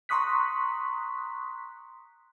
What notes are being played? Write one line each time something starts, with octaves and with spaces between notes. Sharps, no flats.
A#5 C6 C#6 D#6 F#6 B6